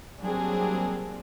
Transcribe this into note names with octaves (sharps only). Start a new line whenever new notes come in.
F#3 G3 A#3 C4 D4 G#4